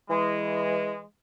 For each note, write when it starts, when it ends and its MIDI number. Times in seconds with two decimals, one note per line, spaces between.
0.10 1.02 52
0.10 1.02 56